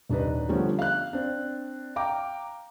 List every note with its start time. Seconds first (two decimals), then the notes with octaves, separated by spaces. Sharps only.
0.09 D#1 D4 D#4 B4
0.49 D3 F3 G3 A3 B3 C#4
0.79 F5 F#6
1.13 C4 D4
1.96 F5 G5 A#5 D6